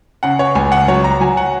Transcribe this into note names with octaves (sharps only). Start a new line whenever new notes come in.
C#3 F#5
C#5
C#2 G#5
F#5
F#3 C#5
A#5
F#3 G#5
F#5